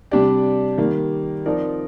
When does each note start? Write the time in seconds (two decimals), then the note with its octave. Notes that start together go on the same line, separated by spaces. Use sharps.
0.11 C3 G3 D4 G4 D5
0.78 D#3 G3 A#3
1.46 F3 C4 D#4 A#4 D5